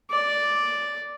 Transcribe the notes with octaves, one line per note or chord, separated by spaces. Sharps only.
D5